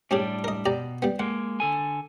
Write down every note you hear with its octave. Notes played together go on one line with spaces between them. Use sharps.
A2 G3 C#4 D4 G4 G#4
A#4 D#5
B2 G4 D5 A#5
G3 B3
G#3 A#3 F#5
D3 A4 G#5